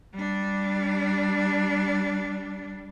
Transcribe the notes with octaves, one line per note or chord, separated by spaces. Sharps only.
G3 D4